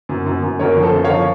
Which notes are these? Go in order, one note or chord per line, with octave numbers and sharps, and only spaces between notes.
F#2
F#2
F#2
F#2 A#4 C#5
F3
A4 C5
F#2
C#5 F5
F3